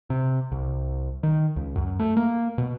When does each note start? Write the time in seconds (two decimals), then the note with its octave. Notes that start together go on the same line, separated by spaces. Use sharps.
0.10 C3
0.52 C2
1.23 D#3
1.56 C#2
1.76 F#2
1.99 A3
2.17 A#3
2.58 B2